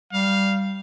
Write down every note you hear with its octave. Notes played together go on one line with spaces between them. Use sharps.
G3 F5